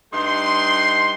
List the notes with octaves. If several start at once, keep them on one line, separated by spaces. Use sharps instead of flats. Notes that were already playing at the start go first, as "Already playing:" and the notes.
G2 A3 D#4 C6